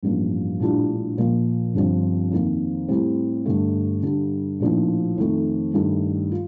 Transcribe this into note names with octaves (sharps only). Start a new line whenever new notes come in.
A1 G2 F3 A#3
A#1 A2 G3 D4 F4
A#2 F3 A#3 F4
G1 G2 F3 C4
F2 D#3 A#3
A2 G3 C4
G1 G2 D3 A3
G2 D3 G3
A#1 A2 F3 A#3 D#4
F2 D#3 A3
G2 D#3 A3 D#4
F4